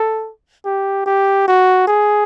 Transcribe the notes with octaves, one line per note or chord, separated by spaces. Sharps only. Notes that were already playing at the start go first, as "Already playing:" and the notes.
Already playing: A4
G4
G4
F#4
G#4